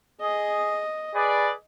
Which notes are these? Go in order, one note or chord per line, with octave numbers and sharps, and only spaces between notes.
G#4 D#5
G#4 B4 D5